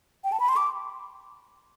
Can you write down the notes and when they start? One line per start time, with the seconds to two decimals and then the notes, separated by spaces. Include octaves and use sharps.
0.24 G5
0.32 A5
0.40 B5
0.49 C6
0.57 D6